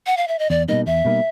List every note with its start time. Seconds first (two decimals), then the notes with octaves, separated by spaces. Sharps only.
0.06 F#5
0.17 F5
0.28 E5
0.39 D#5
0.50 E2 D5
0.68 B2 G3 A#3 D#4 D#5
0.86 E2 E5
1.05 B2 G3 A#3 D#4